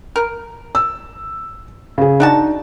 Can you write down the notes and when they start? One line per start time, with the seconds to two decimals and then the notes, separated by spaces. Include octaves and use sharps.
0.16 A#4
0.75 E6
1.98 C#3 G#4
2.20 D4 D#4 F#4 A5